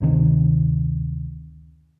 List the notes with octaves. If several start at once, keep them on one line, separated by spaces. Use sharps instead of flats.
F#1 D2 C3 D#3